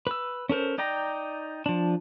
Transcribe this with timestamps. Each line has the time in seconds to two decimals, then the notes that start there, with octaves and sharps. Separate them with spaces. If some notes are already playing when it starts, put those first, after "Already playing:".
0.07 B4 E6
0.49 C#4 A4 A#4 C5
0.78 D#4 D5 G5 A#5
1.66 F3 D4